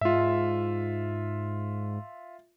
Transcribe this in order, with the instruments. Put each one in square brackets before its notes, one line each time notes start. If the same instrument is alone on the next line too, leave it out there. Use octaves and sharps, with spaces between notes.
[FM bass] G#2 [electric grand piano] F4 E5